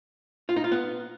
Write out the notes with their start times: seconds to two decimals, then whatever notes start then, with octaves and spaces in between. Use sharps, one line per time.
0.49 F4
0.56 D#4
0.64 F4
0.72 B3